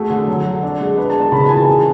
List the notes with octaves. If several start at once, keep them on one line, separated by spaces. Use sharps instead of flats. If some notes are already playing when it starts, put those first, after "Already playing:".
Already playing: A3 F#4 G#4
D3
F#3
F#3
D4
G#3
D4 B4
A5
B3
A5
C#3 B5
A5
E3 G#5
A5
G#4